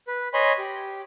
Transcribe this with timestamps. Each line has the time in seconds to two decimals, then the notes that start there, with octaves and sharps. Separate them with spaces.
0.07 B4
0.34 C#5 D#5 G#5 B5 C6
0.58 G4